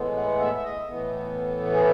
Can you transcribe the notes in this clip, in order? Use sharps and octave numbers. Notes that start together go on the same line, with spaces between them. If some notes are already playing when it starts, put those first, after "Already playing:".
Already playing: A2 E3 G#3 B3
F#5
E5
E5
D#5
A2 E3 B3
G#4